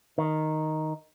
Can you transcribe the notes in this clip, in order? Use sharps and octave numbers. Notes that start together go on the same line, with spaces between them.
D#3